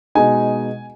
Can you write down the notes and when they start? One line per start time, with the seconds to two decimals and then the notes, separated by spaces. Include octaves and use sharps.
0.15 B2 G#3 D#4 G#5